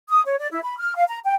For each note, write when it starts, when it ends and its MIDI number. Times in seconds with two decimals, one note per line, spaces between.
0.09 0.22 87
0.26 0.35 73
0.39 0.48 74
0.51 0.59 64
0.63 0.77 83
0.78 0.95 89
0.96 1.04 77
1.08 1.18 82
1.24 1.34 79